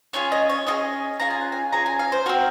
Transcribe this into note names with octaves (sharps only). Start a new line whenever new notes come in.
C#4 F4 G#4 C#5
D#5
C#5
C#4 F4 G#4 D#5
C#4 F4 G#4 A#5
G#5
F#5
G#5
C#4 F4 G#4 A#5
G#5
F5
C5
C4 F#4 A#4